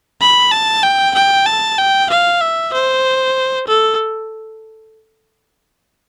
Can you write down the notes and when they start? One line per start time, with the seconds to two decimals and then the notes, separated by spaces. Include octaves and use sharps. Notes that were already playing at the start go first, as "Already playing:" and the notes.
0.21 B5
0.52 A5
0.83 G5
1.15 G5
1.46 A5
1.78 G5
2.10 F5
2.41 E5
2.73 C5
3.67 A4